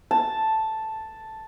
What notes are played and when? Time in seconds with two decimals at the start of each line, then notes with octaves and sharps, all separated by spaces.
0.11 A5